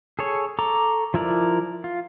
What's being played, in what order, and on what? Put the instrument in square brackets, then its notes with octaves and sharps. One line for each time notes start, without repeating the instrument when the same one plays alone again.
[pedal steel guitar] G#4 A4 C#5
A4 A#5 C#6 D6
F3 E4 A#4 D5
F4